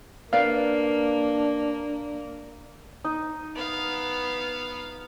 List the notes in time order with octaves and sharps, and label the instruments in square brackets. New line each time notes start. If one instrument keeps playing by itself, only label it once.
[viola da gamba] A#3 [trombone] D4 [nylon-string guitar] A#4 B4 D5 [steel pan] F5
[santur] D#4
[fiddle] B3 F5